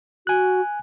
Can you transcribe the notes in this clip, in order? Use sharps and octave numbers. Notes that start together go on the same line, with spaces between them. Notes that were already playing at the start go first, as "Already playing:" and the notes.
F#4 G#5 F#6